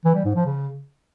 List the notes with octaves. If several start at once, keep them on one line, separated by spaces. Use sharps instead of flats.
E3
G3
G#2
F3
C#3